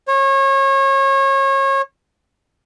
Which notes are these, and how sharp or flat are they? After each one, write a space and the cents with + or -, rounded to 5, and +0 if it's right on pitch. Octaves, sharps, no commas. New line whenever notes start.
C#5 -30